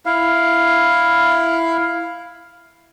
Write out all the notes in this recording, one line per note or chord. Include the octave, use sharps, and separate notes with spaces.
E4 F5